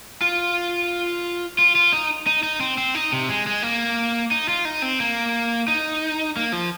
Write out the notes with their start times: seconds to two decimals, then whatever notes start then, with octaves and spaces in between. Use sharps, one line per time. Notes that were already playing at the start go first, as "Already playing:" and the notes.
0.21 F4
1.59 F4
1.75 F4
1.93 D#4
2.27 D#4
2.43 D#4
2.61 C4
2.78 C4
2.95 D#4
3.12 C3
3.29 G#3
3.47 G#3
3.63 A#3
4.31 D#4
4.49 F4
4.65 D#4
4.82 C4
5.00 A#3
5.68 D#4
6.37 A#3
6.52 F3